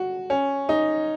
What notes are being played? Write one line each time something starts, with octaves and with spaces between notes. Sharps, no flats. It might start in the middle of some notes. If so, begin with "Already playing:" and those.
Already playing: F#4
C#4
D#4